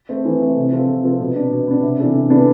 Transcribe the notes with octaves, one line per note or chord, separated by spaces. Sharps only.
A3 C4
E3
A3 C4
C3
F3 C4 F4 A4
C3
F3 C4 F4 A4
B2
B3 D4
B2
B3 D4
C3
E3 B3 D4 A4
C3
E3 B3 D4 A4